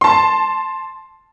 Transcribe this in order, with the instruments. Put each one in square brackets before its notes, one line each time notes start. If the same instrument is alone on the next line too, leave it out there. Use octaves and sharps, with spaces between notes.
[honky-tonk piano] A5 C6